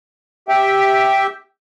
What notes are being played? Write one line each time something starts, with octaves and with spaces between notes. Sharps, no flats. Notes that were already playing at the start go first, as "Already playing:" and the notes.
G4 E5 G5